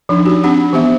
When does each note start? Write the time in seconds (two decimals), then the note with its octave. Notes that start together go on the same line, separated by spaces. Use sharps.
0.09 F3 D4 D#4
0.25 F#4 G4
0.44 C4 D4 G4 F#5
0.73 E3 B3 G4 E5